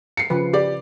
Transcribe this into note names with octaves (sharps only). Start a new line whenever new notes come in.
C7 C#7
C#3 F3 B4
G4 D5